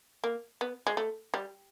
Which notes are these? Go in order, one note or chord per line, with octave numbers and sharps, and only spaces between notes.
A#3
B3
G#3
A3
G3